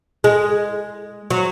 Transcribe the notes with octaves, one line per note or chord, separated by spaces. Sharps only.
G#3
F#3